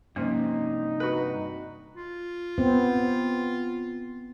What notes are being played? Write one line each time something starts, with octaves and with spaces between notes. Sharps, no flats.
G2 C3 F3 A#3 C#4 D#4
F#4 B4
F4
B3 C4